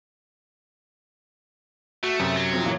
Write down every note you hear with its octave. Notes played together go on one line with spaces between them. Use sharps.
A3 F#4
F#2 C3
F#3 A6
F3 C4
A#2 E3 A#3